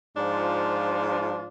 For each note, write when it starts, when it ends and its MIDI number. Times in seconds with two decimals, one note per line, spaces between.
0.17 1.48 44
0.17 1.48 53
0.17 1.48 62
0.17 1.48 65